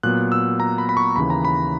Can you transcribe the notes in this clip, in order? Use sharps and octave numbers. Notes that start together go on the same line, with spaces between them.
A#2 F#3 B3 F#6
E6
A#5
B5
B5
C#6
D#2 C#3 E3 B5
A#5
B5